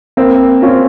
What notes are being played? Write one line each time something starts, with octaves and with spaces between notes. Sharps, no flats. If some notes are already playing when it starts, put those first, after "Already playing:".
A#3 C4
C#4 F4 C5